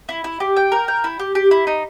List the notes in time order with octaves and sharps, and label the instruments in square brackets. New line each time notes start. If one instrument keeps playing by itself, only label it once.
[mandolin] E4
E4
G4
G5
A#4
G5
E4
G4
G4
E4
D#4